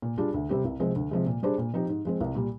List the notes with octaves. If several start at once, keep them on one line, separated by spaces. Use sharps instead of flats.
A#2
G3 D4 F4 G#4
D2
C3 G3 C4 G4
C2
C3 F3 G#3 C4
D2
C3 F3 G#3
A#2
G3 D4 G#4 C5
A#2
F3 C4 D#4 G4
G#2
F3 G#3 C4
C2
A#2 G3